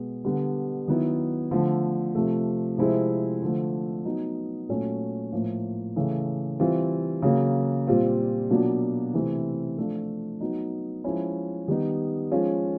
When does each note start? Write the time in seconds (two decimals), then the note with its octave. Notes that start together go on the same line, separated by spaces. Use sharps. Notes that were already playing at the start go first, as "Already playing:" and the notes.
Already playing: B2 G#3 B3
0.25 D3 G3 B3
0.88 D#3 F#3 B3 E4
1.51 D3 F3 A3
2.15 C3 F3 A3
2.78 C3 F3 G#3 C4 E4
3.42 D3 F3 A3
4.05 F#3 B3 D#4
4.69 A#2 F#3 A3 C#4
5.32 A2 F3 A#3
5.96 C#3 E3 A3
6.60 E3 G3 C4 F4
7.22 C#3 F#3 A#3
7.87 A#2 G3 C4 F4
8.50 B2 F#3 A#3 D4 F4
9.14 C3 E3 A3 C4 E4
9.78 F3 A3 D4 F4
10.41 F#3 B3 D#4
11.04 F3 G#3 C#4 E4
11.68 D#3 G3 B3 D#4
12.31 F3 G#3 C#4 F4